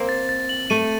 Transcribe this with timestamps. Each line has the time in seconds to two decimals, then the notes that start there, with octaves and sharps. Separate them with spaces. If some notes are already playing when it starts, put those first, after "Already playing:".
Already playing: A#3 C4
0.09 A6
0.29 A6
0.49 F#7
0.70 A3 D#7